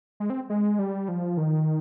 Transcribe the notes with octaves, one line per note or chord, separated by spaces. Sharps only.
G#3
C4
G#3
G3
F3
D#3